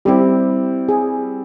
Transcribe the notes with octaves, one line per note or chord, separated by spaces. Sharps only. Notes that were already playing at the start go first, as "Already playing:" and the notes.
G3 C4 E4 G4
G#4